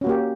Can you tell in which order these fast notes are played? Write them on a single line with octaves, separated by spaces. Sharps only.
C#4 F#4 A#3 G4